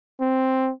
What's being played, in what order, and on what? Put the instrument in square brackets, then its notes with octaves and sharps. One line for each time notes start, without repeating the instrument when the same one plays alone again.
[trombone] C4